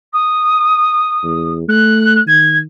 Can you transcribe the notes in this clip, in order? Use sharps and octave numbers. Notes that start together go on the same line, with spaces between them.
D#6
E2
A3 F#6
D#3 G#6